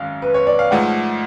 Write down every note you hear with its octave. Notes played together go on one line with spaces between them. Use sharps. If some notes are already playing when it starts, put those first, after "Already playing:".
Already playing: G#1 F#2 F5
B4
C#5
D5
F5
G#2 F3 A3 F#5